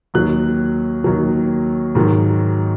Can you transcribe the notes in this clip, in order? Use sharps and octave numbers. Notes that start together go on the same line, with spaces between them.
D#2 D#3 F#3 F#6
D#2 D#3 F#3
G#2 D#3 F#3